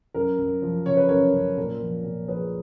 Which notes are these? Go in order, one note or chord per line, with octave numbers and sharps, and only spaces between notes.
F#2 A#4
F#2
F3
C#3 C#5
B4
F#2 A#4 C#5
F#2
A#2 A#4
F3
A#2
F3 G#4 B4